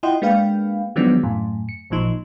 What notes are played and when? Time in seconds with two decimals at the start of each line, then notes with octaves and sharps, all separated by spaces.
0.03 E4 F4 D#5 F#5 G5 C6
0.22 G#3 A#3 D4 B4 F5 G5
0.96 D#3 F3 F#3 G#3 B3 D4
1.23 F#2 A2
1.69 C#7
1.90 A1 A#2 F3 D#4 C6